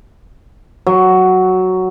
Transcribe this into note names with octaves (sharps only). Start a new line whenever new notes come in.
F#3